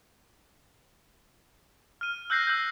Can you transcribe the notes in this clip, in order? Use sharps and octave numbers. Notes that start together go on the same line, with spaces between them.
F6 D#7
E6 F#6 G6 A#6 C7
E6 F#6 G6